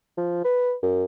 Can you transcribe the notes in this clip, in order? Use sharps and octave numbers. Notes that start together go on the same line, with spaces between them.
F3
B4
F#2